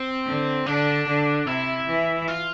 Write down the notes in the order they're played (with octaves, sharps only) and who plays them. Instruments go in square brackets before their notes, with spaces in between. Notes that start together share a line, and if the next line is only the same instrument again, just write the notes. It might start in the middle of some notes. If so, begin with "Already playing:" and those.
Already playing: [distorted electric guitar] C4
[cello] D3
[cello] D3 [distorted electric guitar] D4
[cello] D3
[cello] C3 [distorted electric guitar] E4
[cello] E3
[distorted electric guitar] F4